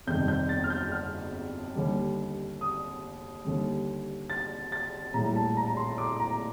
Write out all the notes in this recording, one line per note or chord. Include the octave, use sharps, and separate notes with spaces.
G1 F2 C3 D#3 G3 G6
G6
A6
F6
G6
F6
D#2 D3 G3
D#6
D#2 D3 G3
A6
A6
A#1 A2 G3 A#5
A5
A#5
C6
D6
A#5